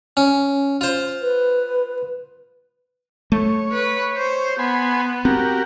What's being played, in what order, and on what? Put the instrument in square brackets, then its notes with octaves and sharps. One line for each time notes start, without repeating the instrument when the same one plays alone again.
[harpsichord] C#4
F4 C5
[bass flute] B4
[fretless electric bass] A3 [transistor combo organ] C#5
[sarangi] B4
C5
[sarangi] B3 [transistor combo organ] G#5 B5 C6
[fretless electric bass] C4 [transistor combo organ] F#4 G4 A#4